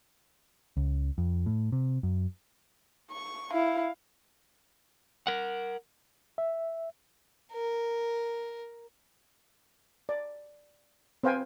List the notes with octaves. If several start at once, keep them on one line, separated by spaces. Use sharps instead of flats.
C#2
F2
A2
C3
F#2
C#6
E4 F5
A#4 F#5
E5
A#4
D5
C4 B4 C5 F5 G5 G#5